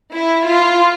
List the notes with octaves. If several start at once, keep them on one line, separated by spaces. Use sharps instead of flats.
E4
F4